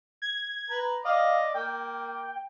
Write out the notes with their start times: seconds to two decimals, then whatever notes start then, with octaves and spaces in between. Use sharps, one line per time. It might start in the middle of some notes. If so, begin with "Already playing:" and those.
0.22 G#6
0.70 B4 A#5
1.05 D5 D#5 F5
1.54 A#3 G5